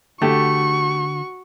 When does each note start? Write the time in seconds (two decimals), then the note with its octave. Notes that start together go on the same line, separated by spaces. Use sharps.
0.22 D3 A3 F#4 G4 C#6